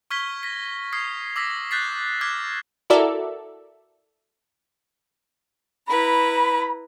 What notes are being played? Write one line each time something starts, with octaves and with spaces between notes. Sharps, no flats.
C#6 F6 G#6 B6 G7
A#6 B6
D#6 F6 G#6 C7
D6 E6 A#6 B6
F#6 G6 A6 B6 C7
D6 F6 F#6 G#6 B6
E4 F#4 A4 A#4 D5 E5
E4 B4 A#5 B5